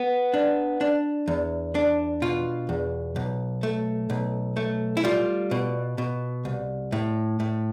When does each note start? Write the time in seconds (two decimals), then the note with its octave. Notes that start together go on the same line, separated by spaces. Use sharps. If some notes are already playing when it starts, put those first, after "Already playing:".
Already playing: B3
0.34 D4
0.81 D4
1.28 E2
1.75 D4
2.22 B2 F4
2.69 E2
3.16 B1
3.63 A3
4.10 B1
4.57 A3
4.97 E4
5.04 G3 F4
5.51 B2
5.98 B2
6.45 C2
6.92 A2
7.40 A2